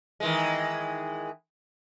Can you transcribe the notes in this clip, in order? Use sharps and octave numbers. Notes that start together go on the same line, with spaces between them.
D#3 E3 G#3